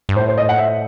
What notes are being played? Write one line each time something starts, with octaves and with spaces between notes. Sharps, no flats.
G2
A2 C5
C5
D#5
F#5
E5